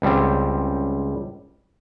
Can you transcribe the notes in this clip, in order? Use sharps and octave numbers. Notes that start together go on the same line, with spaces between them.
C#2 G3 C4